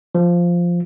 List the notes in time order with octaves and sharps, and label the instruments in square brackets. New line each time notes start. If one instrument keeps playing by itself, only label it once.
[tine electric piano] F3